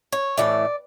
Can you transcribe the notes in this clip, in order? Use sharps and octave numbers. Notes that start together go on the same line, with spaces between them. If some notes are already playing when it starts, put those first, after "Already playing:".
C#5
A2 E3 A3 D5